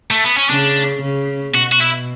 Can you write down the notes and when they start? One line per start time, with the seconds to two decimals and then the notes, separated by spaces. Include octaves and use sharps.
0.11 A3
0.24 B3
0.37 C#4
0.49 C#3 D4
1.02 C#3
1.55 B2 F#4
1.72 F#4
1.81 E4